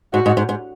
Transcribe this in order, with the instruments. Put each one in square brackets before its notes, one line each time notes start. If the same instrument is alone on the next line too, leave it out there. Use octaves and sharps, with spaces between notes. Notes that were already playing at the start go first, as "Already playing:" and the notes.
[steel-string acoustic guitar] G#2 [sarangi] F#4
[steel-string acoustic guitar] G#2
G#2
G#2